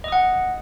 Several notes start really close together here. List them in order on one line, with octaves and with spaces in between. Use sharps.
D#5 D#6 F#5